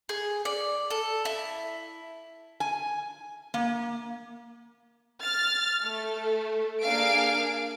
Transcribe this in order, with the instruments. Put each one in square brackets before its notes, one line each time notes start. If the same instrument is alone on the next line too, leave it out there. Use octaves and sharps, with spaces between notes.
[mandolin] G#4
D5
A4
E4
[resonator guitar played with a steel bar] G#5
A#3
[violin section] F6 A6
A3
A#3 D4 G#4 F5 D7